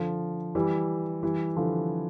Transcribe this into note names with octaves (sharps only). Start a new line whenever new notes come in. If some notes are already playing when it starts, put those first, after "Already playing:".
Already playing: D3 F3
E3 G3
E3 G3
D3 F3